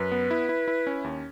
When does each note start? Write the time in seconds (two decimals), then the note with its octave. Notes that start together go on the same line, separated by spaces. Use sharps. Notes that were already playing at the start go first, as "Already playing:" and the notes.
Already playing: F#2 B4
0.12 B3
0.31 E4
0.49 E4
0.68 E4
0.87 C#4
1.04 D#2